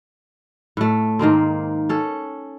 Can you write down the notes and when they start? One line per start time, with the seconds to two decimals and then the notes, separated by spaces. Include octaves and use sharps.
0.77 A2 A3
1.19 G#2 D#3 A#3 C4
1.89 C#4 A4